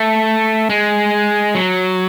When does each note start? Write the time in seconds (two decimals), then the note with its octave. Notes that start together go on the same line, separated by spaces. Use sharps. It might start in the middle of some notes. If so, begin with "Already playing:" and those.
Already playing: A3
0.70 G#3
1.55 F#3